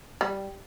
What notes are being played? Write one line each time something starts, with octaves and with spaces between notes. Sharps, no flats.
G3